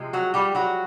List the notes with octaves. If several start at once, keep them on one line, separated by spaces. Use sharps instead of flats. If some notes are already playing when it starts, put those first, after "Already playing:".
Already playing: C3 F3 G#3
F#3 F#4
G3 G4
F#3 F#4